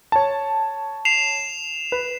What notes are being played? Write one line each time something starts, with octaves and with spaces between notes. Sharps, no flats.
C#5 A5
C7 E7 F7
B4